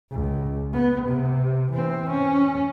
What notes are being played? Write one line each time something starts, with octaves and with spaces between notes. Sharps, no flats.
C#2
B3
C3
E3 C4
C#4